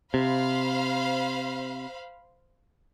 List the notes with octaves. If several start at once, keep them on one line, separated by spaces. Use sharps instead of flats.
C3 C5 F5 B5